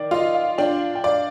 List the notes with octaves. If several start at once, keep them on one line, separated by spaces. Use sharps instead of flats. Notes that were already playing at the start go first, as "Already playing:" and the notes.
Already playing: D#3 D5
F4 D#5
F5
D4 G5
G5
D5 F5